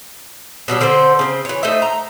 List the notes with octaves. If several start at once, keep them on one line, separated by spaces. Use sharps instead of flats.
B2 F#3 G3 A5
D3 C4 A4 C5
C#3 C4
E3 C#5
A3 D#4 C5 E5
A#5